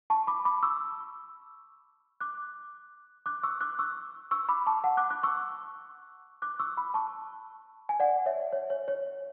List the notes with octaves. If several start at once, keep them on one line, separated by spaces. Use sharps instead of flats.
A5 C#6
B5 D6
B5 D6
C#6 E6
D6 F#6
D6 F#6
C#6 E6
D6 F#6
C#6 E6
C#6 E6
B5 D6
A5 C#6
F#5 A5
D6 F#6
D6 F#6
C#6 E6
D6 F#6
C#6 E6
B5 D6
A5 C#6
G#5
D5 F#5
C#5 E5
C#5
C#5
C#5